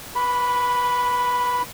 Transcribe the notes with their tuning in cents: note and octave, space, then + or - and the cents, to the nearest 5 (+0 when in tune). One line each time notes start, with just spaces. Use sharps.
B4 -25 B5 +0 D6 -45